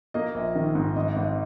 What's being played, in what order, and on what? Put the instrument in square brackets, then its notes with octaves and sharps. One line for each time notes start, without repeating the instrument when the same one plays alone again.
[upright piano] A#3 D#5
A#1
D#3
G#2
G#1 D#5
G#1